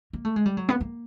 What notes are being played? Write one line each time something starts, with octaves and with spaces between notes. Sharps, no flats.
A#3
A3
G#3
G3
F#3
B3
A#3